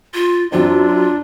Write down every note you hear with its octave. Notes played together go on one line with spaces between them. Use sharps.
F4
F#2 C4 D4 F4